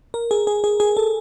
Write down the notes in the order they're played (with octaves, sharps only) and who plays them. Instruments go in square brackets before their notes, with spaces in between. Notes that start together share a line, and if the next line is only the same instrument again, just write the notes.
[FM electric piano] A#4
G#4
G#4
G#4
G#4
A4